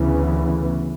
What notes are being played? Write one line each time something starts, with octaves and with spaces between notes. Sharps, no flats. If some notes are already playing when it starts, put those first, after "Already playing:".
Already playing: D2 C#3 E3 B3